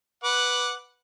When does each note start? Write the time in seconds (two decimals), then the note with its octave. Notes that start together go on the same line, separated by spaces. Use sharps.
0.24 B4 F#5 D6